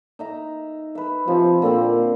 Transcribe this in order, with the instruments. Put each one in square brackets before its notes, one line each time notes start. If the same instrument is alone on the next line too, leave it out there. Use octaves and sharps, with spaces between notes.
[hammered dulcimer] D#4 E5 A#5
B4 E5
[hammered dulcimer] C3 [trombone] F3
[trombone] A#2 [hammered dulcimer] D3 A#3 C4